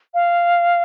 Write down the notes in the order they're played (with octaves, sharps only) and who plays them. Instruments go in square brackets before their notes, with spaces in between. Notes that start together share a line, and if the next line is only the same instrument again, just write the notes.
[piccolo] F5